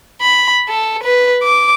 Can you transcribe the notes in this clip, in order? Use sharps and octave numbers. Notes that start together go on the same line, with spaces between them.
B5
A4
B4
D6